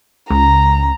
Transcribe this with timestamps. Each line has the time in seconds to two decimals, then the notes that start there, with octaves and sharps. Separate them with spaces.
0.30 C#2 A#5